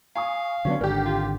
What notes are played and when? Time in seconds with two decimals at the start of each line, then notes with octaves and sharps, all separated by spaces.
0.15 F5 G#5 C#6 D#6
0.65 D3 F#3 B3 C#4 D4
0.81 G#1 D3 G4 A#4
1.06 F4